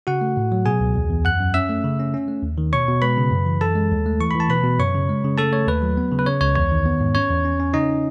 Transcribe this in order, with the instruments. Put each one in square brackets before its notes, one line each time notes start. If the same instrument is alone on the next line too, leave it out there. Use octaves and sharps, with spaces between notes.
[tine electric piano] C#3 F#4 F#5
A3
A2
F#3
B2 G#4 G#5
C#2
E2
E2
F#2 F#5 F#6
F#2
C#4 E5 E6
A3
C#3
C#4
C#4
A3
D#2
D#3
B2 C#5 C#6
B2
G#3 B4 B5
C#3
F#2
E3
F#2 A4 A5
G#3
D#2
A3
E3 C#6
E3 B5
A5
B2 B4 B5
B2
F#2 C#5 C#6
C#3
G#3
C#3
A3 A4 A5
A3 C#5
D#2 B4
F#3
B3
C#3
B4
C#3 C#5
C#2 C#5
E2 C#5
D#3
B3
G#2
C#4 C#5
E2
C#4
C#4
C#3 D#4 D#5